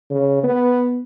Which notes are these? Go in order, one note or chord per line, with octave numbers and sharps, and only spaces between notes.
C#3
B3